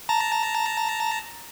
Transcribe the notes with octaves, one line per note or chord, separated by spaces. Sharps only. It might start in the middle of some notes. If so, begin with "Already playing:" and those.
A5 A#5